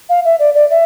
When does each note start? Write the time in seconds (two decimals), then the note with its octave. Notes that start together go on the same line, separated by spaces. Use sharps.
0.09 F5
0.25 E5
0.39 D5
0.55 D5
0.70 E5